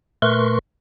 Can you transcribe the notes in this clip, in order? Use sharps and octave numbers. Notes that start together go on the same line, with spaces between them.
A#2 A3 A#4 B4 C6 C#6